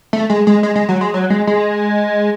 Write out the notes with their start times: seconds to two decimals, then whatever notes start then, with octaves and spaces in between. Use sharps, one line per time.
0.13 A3
0.30 G#3
0.47 G#3
0.63 G#3
0.75 G#3
0.89 F#3
1.01 G#3
1.14 F#3
1.30 G#3
1.47 G#3